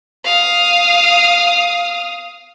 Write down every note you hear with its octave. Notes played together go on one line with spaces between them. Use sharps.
F5 D#6